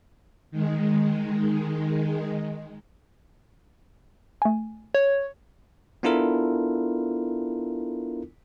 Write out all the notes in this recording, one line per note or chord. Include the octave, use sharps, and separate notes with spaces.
D#3 G#3
A3 G#5
C#5
B3 D4 E4 F4 A4 A#4